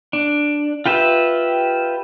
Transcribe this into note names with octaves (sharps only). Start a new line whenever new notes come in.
D4
F4 G4 B4 E5